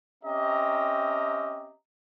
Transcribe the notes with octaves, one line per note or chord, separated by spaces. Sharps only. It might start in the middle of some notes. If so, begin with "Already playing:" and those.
C4 C#4 G4 D#5 E5 A#5